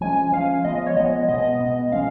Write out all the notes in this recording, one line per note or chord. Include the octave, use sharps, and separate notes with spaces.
F3 G#3 C#4 G#5
F3 G#3 C#4 F5
F3 G#3 B3 D#5
D#5
C#5
F3 G#3 B3 D#5
B2 G#3 B3 D#5
B2 G#3 B3
F3 G#3 C#4 F5